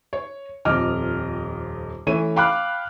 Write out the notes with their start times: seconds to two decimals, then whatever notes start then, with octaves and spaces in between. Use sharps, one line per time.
0.13 C#5
0.65 D#1 F2 D#5 D6 F6
2.07 E3 A3 C#4 C#5 D#7
2.36 F5 G5 B5 D6 F6 F#6